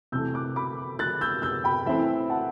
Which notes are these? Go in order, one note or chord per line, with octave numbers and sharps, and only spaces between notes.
C3 E3 A3 E6 G6
D6 F#6
B5 D6
F#6 A6
E6 G6
E6 G6
G5 B5
E3 A3 C4 E4 E5 G5
F#5 A5